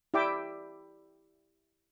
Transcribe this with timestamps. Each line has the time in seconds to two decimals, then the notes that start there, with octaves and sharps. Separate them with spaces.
0.14 E4 G4 D5 E5 G5 D6